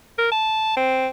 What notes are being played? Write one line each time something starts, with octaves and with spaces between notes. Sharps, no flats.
A#4
A5
C4